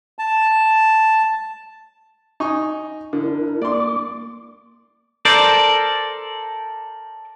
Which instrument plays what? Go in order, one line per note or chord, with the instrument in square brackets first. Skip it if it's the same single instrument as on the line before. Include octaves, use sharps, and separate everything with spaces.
[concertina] A5
[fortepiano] D#4 G#5 C#6
[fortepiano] D3 [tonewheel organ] D4 E4 A#4
[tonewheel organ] A#3 D6 [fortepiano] D5 C6
[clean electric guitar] A4 A#4 C5 D5